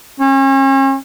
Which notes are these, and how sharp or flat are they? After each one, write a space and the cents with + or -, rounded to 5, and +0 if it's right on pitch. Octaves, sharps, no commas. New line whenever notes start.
C#4 -40